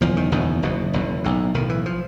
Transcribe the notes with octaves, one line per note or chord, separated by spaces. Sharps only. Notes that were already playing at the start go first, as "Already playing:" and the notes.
F#1 E2 B2 F3
D#3
F#1 E2 B2 D#3
F#1 E2 B2
F#1 E2 B2
B1 A2
B1 A2 D#3
E3
F3